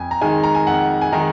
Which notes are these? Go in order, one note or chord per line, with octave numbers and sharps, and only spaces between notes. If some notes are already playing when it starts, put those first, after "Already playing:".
Already playing: F2 G#5
A#5
D#3 G#3 D#4 G#5
A#5
G#5
F2 F#5
G#5
D#3 G#3 D#4 A#5